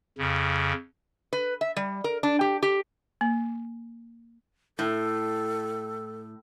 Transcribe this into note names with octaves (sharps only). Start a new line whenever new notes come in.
F2 C#3
B4
E5
G3
A#4
D4
G4
G4
A#3
A2 A4